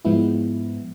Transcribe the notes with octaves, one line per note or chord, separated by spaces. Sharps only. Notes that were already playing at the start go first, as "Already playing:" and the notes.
G#2 F3 G#3 B3 E4